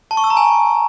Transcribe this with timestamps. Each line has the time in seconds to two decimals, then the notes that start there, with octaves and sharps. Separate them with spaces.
0.11 A5
0.17 C#6
0.24 E6
0.30 A#5
0.37 G#5